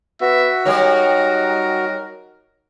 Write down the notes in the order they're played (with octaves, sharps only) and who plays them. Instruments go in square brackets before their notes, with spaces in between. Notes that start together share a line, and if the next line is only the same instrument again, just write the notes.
[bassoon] B3 [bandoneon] F#4 [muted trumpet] E5
[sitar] F#3 G3 C#5 [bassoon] D#4 [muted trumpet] A#4